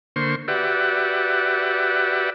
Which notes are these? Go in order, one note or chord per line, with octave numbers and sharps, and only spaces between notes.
D3 A#3 C5 C6 C#6
F#4 G4 B4 D5 E5 F#5